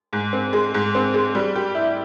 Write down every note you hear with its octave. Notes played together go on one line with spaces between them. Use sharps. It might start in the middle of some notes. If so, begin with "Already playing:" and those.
G#2
C4
G#3
G#2
C4
G#3
G3
G4
E4